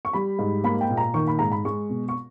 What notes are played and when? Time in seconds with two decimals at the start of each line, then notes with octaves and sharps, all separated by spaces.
0.05 C#6
0.13 G3 B5
0.39 G#2
0.64 A#3 B5
0.81 G5
0.90 A#2
0.97 A#5
1.14 D#3 C#6
1.27 B5
1.39 G#2 A#5
1.52 B5
1.65 G#3 C#6
1.90 B2
2.09 C#6